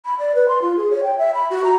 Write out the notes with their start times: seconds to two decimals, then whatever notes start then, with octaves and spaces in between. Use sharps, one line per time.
0.05 B5
0.19 D5
0.35 B4
0.48 C6
0.62 F4
0.77 G#4
0.91 C#5
1.03 G5
1.18 E5
1.34 B5
1.50 F#4
1.64 A#5